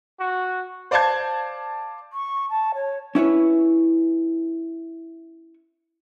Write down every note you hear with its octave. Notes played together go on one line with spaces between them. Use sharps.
F#4
C5 D5 F5 A5 G6 G#6
C#6
A5
C#5
C#4 E4 B4 C#5